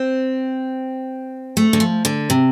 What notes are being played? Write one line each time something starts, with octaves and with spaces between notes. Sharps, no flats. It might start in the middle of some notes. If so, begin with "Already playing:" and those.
Already playing: C4
A3
D3
F3
D3
C3